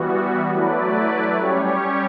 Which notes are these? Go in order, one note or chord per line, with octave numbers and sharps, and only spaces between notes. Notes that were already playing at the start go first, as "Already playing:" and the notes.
Already playing: E3 G3 B3 F#4
F#3 A3 E4 B4 D5
G3 C#4 G4 C#5